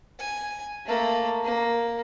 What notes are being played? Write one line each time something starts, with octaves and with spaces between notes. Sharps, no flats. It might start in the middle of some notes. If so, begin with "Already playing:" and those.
G#5
A3 A#3
A#3